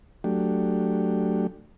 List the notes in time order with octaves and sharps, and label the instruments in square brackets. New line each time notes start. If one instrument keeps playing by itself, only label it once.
[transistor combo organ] F#3 A3 D4 G4